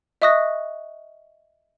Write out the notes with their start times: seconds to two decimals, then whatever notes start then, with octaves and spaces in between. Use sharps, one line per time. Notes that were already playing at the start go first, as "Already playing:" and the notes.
0.22 D#5 E5 C#6 D#6 F#6 A#6